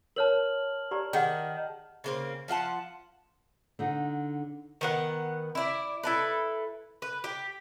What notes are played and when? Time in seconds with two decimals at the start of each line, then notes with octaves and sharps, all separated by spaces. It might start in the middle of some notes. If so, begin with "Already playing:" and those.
0.16 A#4 C#5 A5 F6 F#7
0.91 G4 D5 A#5
1.13 D#3 G#4 F#5
2.04 C#3 A#3 C4
2.48 F3 F4 F#5 A5
3.79 D3 D#4 F#5
4.81 D#3 B3 F#5
5.55 E4 D5
6.03 E4 A4 B4
7.02 B4
7.24 G4